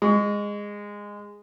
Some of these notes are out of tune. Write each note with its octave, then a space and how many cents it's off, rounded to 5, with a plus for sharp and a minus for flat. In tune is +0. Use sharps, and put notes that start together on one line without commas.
G#3 -15 C#6 +25